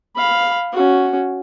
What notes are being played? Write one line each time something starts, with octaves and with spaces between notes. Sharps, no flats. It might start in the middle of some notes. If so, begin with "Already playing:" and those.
F5 B5
C#4 F#4